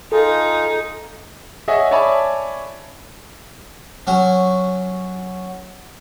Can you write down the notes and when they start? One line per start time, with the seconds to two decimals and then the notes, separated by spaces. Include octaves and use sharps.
0.12 D#4 F4 G#4 A4
1.68 G#4 C#5 D#5 E5 F#5 G#5
1.91 C#5 D5 E5 G#5 A5 B5
4.07 F#3 C#4 F#4